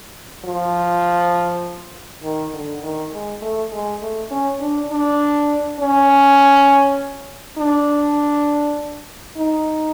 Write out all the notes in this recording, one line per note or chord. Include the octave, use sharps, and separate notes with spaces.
F3
D#3
D3
D#3
G#3
A3
G#3
A3
C#4
D4
D4
C#4
D4
D#4